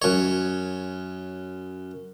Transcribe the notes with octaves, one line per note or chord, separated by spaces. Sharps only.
F#2 C#5